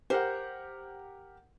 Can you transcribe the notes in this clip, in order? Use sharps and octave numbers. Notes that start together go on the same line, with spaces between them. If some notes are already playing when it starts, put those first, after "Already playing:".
G4 A#4 C5 F#5